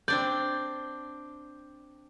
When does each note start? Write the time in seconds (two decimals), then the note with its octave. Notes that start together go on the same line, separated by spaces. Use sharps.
0.08 C4 D4 D5 G6